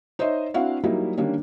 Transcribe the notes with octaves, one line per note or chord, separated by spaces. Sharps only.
D#4 C5 C#5 D#5 E5
C4 D4 E4 F#4 F5 F#5
F#3 G3 A#3 D#4 E4
D3 D#3 G3 A#3 C#4 D4